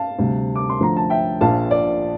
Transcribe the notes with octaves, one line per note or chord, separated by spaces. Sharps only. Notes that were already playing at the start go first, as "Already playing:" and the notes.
Already playing: F5 A5
D2 C3 G3
D6
C6
D2 D3 F3 A#5
A5
E5 G5
A#1 A#2 F3 F5 A5
D5